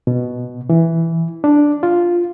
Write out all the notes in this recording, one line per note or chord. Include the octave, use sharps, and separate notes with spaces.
B2
E3
D4
F4